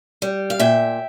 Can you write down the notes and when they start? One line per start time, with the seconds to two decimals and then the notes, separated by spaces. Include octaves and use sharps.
0.22 G3
0.50 F5
0.59 A#2 E5 G5